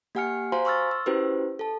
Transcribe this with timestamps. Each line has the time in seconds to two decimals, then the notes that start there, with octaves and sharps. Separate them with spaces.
0.15 A#3 G4 F#5 G#5 F6 C#7
0.52 F#4 C5 F5 G#5 A#5 C6
0.65 C6 C#6 E6 F6 A6
0.91 E6
1.06 C#4 E4 F#4 G4 B4 C5
1.59 A4 A5